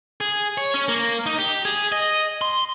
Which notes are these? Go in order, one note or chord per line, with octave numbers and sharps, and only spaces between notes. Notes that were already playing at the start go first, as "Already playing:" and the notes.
G#4
C#5
C#4
A#3
D#4
G4
G#4
D#5
C6